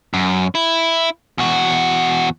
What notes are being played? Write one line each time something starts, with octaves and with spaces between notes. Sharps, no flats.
F#2
E4
E2 F#4